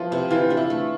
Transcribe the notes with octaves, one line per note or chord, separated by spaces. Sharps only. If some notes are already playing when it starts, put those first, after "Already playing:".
Already playing: F3 B3 E4 F4
C3 E4
E3 F4
D4 F4
E4
A3